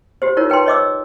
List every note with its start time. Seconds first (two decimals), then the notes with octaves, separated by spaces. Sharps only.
0.22 F#4 G4 C5
0.37 D#4 F4 A#4 C#5
0.50 B4 G5 A5 C6
0.66 C#5 D#5 D6 E6